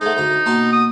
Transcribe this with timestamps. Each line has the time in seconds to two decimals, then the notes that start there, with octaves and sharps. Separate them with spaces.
0.01 G#3 A3 D#4 C5 F#5
0.17 D2 A#5
0.46 B2 A#3 A5 C6
0.73 F#5 D#6